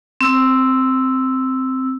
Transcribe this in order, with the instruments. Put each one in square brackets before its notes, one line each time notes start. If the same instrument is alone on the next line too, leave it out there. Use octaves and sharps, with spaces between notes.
[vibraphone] C4 E6